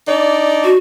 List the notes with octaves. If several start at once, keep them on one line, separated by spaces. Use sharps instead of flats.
D4 D#4 D5
F#4